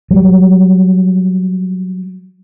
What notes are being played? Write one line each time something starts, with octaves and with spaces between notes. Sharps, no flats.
F#3 G3